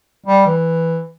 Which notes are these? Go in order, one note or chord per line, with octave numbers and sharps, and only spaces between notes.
G3
E3